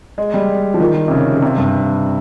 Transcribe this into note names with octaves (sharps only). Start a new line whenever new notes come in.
G#3
G3
F3
D#3
C3
C#3
C#3
C3
G2